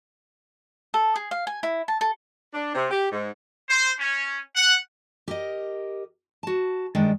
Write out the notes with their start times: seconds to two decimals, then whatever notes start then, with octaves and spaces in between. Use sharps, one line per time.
0.94 A4
1.16 G#4
1.31 F5
1.47 G#5
1.63 E4
1.88 A5
2.01 A4
2.54 D4
2.75 C3
2.91 G4
3.12 G#2
3.69 C5
3.99 C#4
4.56 F#5
5.28 G4 A#4 D#5
6.43 F#4 A5
6.95 G2 D#3 G#3 D4 G5